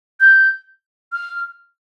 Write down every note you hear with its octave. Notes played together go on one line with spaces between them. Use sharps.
G6
F6